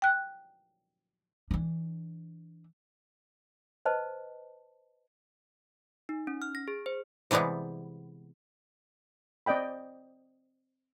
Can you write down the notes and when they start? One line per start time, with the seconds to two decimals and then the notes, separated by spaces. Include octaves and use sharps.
0.02 G5 F#6
1.51 E3 D4
3.85 B4 C5 D#5 A5
6.09 D#4
6.27 C#4
6.42 F6
6.55 A#6
6.68 G#4
6.86 C5
7.31 C3 E3 G3 G#3 B3
9.46 C4 D5 D#5 G5 B5